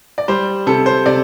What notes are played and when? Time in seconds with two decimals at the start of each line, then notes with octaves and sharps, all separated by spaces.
0.18 D5
0.28 G3 C5
0.67 C3 A4
0.86 C5
1.06 C3 D5